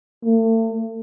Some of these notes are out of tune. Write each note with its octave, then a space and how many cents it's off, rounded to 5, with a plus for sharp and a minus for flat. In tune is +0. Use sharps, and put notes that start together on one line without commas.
A3 +40